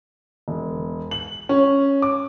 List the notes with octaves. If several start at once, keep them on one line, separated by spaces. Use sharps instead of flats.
E1
F#7
C#4
D6